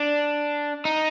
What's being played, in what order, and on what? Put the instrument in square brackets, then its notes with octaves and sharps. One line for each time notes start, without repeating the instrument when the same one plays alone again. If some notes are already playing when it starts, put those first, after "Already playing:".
Already playing: [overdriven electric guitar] D4
D#4